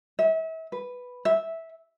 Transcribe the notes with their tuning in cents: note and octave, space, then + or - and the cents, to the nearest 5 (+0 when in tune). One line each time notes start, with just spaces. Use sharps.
E5 -35
B4 +0
E5 -10